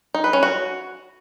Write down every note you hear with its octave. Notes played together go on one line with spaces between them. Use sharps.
D#4
B4
C#4
F#4